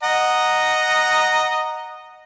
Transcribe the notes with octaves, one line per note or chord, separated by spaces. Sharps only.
D#5 F#5 A#5